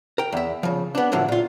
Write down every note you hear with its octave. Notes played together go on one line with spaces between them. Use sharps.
A#4 G5
E2 E5
C#3 F3
B3 D4
A2 D3 F3 F#3 A#3
A#2 F4